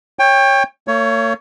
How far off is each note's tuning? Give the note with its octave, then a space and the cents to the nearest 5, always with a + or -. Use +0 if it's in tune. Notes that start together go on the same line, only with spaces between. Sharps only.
C#5 -5 G5 +25
A#3 -45 C#5 +15